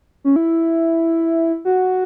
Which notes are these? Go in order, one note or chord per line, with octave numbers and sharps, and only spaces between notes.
C#4
E4
F#4